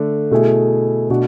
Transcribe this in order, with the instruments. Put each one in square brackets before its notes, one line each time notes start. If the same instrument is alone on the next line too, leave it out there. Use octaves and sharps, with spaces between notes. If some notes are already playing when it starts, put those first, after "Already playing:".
Already playing: [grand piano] D3 A3 D4
B2 A3 E4 G#4
B2 A3 D4 F#4